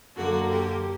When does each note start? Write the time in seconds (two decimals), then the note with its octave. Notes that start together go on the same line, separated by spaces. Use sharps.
0.16 F#2 D3 A#3 F#4
0.49 G4